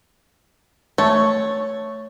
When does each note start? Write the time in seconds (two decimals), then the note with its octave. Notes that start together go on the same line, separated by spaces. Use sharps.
0.98 A3 C#5